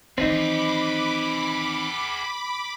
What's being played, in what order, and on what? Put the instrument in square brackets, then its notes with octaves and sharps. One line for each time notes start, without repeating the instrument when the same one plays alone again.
[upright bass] D#3 E3 [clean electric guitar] C4 D#4 [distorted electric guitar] G#4 B4 [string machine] B5 D6